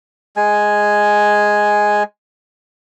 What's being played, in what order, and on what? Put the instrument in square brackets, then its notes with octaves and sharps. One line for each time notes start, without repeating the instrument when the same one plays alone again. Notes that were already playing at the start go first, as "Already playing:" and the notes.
[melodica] G#3 G#5